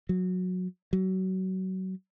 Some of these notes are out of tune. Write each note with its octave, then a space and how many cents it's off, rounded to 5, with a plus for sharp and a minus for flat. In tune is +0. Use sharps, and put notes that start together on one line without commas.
F#3 -15
F#3 +25